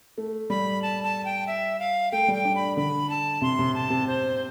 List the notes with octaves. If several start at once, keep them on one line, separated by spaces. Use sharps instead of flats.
A3
G3 B5
A5
A5
G5
E5
F5
A3 G5
G3
G5
D4
B5
D3 B5
A5
C3 C6
C3
A5
C3
C5